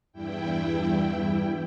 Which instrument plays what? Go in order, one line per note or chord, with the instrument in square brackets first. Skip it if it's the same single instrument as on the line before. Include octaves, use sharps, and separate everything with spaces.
[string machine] E2 G2 E4 G5